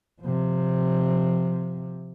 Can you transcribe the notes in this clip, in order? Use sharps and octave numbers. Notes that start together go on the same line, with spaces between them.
C3 F3